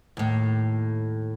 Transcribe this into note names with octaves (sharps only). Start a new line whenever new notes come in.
D#2 A2